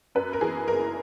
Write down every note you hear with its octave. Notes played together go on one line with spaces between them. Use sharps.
F#2 B4
A#4
E3 G#4
F#1 A#4